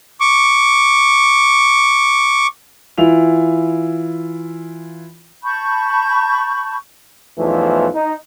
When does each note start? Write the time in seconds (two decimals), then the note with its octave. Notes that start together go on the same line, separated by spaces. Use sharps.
0.20 C#6 D6
2.98 E3 E4 F4 F7
5.43 A5 B5 C#6 G6
7.39 B1 E2 E3 F3 A3
7.95 D#4